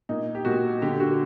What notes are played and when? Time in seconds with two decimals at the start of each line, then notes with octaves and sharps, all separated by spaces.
0.09 A#2 D#4
0.35 G4
0.45 A#2 F#4
0.82 D3 G4
1.00 F#4